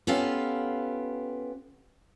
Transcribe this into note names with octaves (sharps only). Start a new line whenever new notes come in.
B3 C#4 F4 G4 A4 F5